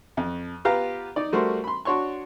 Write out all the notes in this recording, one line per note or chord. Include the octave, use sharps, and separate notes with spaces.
F2
B3 F4 G4 B4 F5 A#5
D#4 D5
G3 A3 F#4 A#4 C5
B5 C6
D4 F#4 C#5 C6 C#6